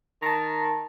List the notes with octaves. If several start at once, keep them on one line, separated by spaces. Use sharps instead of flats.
D#3 A5 A#5